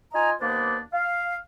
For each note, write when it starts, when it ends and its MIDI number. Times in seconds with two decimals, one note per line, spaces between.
0.14 0.32 63
0.14 0.32 65
0.14 0.32 75
0.14 0.32 80
0.14 0.32 82
0.41 0.78 39
0.41 0.78 58
0.41 0.78 59
0.41 0.78 62
0.41 0.78 72
0.93 1.35 77